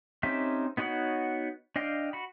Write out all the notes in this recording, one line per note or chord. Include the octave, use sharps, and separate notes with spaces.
C4 C#4 D#4 G4 E5
B3 D#4 F#4 C#5 F#5
D4 D#5 F5 G5
F#4 B5